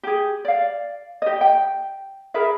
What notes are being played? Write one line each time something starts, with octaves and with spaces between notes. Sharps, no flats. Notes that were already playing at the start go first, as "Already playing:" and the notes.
G4 G#4
D5 F5
G4 D#5
G5
G#4 A#4 B4 E5